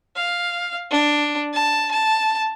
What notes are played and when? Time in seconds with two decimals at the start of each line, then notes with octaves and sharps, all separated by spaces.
0.16 F5
0.91 D4
1.53 A5
1.91 A5